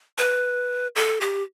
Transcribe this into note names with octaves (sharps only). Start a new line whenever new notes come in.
B4
A4
G4